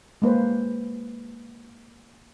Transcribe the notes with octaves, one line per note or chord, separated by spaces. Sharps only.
G#3 A#3 B4 C5